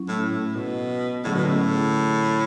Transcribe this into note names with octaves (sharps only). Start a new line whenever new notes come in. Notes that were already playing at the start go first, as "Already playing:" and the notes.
Already playing: F#3 C#4 E4
A2
A2
B2
A2 D3 F#3 C#4 G#4
B2
A2